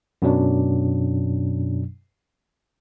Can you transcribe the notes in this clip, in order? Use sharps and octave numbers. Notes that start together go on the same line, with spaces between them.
F#2 B2 F#3 D4